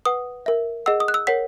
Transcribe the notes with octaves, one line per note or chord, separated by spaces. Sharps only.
B4 F#5 D#6
A#4 E5
G#4 D#5 F#5 E6
D#6
F#6
E6
A#4 C#5 F#5 B6